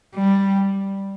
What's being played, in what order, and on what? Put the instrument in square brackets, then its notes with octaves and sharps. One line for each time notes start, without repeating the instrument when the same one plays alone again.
[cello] G3